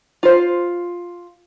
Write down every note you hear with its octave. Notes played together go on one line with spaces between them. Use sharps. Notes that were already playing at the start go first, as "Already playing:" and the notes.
F4 C5